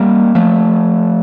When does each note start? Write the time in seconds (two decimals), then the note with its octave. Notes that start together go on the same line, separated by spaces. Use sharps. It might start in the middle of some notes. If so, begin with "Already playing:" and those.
Already playing: G3 A#3
0.35 F3 A3